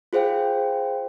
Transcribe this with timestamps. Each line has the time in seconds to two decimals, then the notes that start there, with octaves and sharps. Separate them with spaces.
0.13 F4 G#4 C5 F5 G5